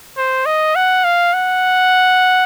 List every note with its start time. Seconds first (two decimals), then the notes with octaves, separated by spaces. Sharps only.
0.17 C5
0.46 D#5
0.76 F#5
1.04 F5
1.34 F#5